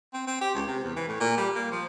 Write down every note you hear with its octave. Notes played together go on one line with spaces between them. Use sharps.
C4
C4
G4
C#2
C3
E2
E3
A2
A#2
G3
A#3
F3